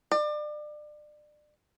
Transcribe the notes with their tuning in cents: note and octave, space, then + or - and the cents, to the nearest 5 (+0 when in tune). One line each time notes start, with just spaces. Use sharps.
D5 +30